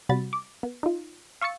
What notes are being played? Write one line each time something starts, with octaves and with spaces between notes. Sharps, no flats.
C3 G3 F#4 B5 A6
D6
B3
D#4 F4
F5 C#6 E6 A6 C#7